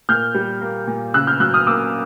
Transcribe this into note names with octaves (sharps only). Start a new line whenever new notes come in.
A#2 F6 G6
G3
A#3
A#2
C#3 E6 F#6
F6 G6
F#3 E6 F#6
D#6 F6
A#3 D6 E6